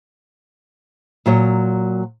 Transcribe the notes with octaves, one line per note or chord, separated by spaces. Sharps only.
A#2 F#3 C#5